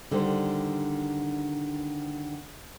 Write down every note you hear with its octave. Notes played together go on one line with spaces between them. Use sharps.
D3 D#3 G3 C5